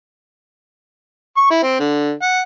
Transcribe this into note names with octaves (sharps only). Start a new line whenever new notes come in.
C#6
E4
C4
D3
F#5